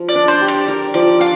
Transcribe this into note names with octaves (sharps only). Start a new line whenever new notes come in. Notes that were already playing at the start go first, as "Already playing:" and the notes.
Already playing: F3
D5
D4
C5
G4
D5
A#4
F3 D5
D4 F4